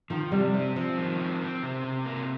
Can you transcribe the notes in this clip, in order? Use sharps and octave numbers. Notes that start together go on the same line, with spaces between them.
D#3 F3
C3 G3
C4
F3 C4
D#3
C4
C4
C3
C3
A#3